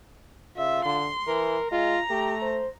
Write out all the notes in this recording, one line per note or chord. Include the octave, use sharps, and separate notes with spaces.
C#3 F4 E5
D3 C6
E3 A#4
G#3 F4 A#5
A3 G4
C5